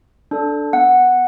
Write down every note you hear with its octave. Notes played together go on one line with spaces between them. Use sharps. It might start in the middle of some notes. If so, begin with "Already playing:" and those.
D4 A4
B3 F#5